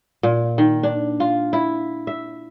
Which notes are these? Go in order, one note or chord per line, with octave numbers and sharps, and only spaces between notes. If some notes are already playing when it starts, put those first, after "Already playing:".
A#2
D#3
D4
F4
E4
E5